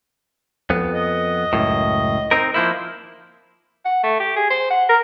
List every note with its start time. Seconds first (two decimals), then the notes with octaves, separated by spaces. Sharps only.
0.70 F2 B3
0.93 D#5
1.53 C#2 F#2 A2
2.31 C4 D#4 A#4
2.54 F3 A#3 E4 C5
3.85 F#5
4.04 A3
4.20 G4
4.36 G#4
4.50 C5
4.70 F#5
4.89 A#4